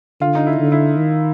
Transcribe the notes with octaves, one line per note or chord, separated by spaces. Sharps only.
D3 F4
D#4
E4
D3
E4
D#3